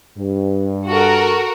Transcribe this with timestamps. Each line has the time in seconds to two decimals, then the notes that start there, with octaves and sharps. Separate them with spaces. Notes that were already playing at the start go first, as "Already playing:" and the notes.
0.18 G2
0.89 F#4 A4 A#4